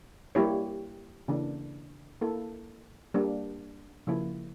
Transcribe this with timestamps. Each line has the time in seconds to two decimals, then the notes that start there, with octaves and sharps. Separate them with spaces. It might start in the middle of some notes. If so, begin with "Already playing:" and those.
0.35 G3 A#3 E4 G4 C#5
1.28 C#3 E3 A#3 D4
2.21 A#3 E4 A4
3.14 G3 A#3 D4
4.07 C#3 F3 A#3 E4